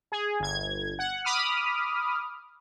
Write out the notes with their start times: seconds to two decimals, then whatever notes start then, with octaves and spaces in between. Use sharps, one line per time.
0.12 G#4
0.40 G1 G#6
0.99 F#5
1.24 B5 D6 D#6 F6